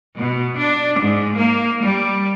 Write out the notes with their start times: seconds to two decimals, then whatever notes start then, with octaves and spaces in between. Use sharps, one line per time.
0.18 B2
0.58 D4
1.00 G#2
1.37 A#3
1.82 G3